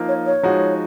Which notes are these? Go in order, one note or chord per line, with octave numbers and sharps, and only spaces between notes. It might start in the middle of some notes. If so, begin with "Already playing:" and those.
Already playing: F3 A#3 D#4
C#5
C#5
F3 G#3 D#4 F#4